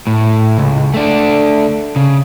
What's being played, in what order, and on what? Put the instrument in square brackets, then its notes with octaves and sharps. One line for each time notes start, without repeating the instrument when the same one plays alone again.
[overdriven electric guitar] A2
C#2
A3 D4
C#3